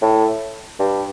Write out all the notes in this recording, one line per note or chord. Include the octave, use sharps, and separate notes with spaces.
A2
G2